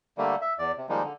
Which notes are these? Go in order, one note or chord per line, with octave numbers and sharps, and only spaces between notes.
D3 G3 A3 A#3
E5
E2 D5
C3
D#3 F3 G3 G#3 A#3 D#4
D3